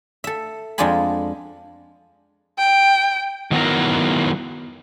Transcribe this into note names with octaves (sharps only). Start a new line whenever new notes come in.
A4 E5
F2 G#3 D4 F4 G#5 B5
G5
D#3 F#3 B3 E4 A#4